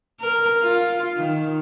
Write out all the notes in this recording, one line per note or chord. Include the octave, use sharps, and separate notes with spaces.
A#4
F4
D#3